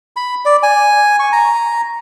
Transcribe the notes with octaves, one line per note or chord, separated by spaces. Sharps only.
B5
D5
G#5
C#6
A#5